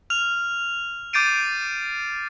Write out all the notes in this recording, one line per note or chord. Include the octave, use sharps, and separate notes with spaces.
F6 F7
D6 G6 A6 C7 D7 D#7